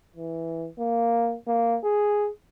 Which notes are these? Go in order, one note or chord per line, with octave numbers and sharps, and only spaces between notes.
E3
A#3
A#3
G#4